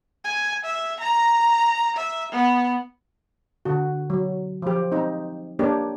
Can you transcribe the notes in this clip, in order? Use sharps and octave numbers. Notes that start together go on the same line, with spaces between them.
G#5
E5
A#5
E5
B3
D3 F#4
F#3
F3 G4
C4 D#4
A#3 D4 G4 C#5